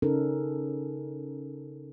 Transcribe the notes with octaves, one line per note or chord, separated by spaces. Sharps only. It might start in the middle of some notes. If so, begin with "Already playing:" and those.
C#3 C#4 D#4 A4 A#4